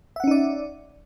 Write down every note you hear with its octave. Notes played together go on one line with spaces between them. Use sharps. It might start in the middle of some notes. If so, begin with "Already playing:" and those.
C#4 D#4 D5 E5 F#5